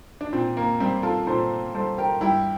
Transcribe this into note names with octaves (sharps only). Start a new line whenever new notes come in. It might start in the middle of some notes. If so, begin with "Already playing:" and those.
D4
A#2 C4
A#3
G3 C4
F4 A4
A#2 A4 C5
G3 A4 C5
G4 A#4
G2 E4 G4